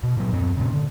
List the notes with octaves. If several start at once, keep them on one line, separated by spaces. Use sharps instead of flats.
B2
A#2 F#3
F#2 C4
A#2 C#3
D3